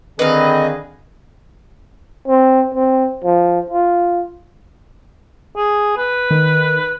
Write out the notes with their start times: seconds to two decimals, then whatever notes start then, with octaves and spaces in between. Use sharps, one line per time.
0.19 D3 D#3 C4 G#4 B4 D#5 F5
2.28 C4
2.75 C4
3.24 F3
3.70 F4
5.56 G#4
5.97 B4
6.31 D#3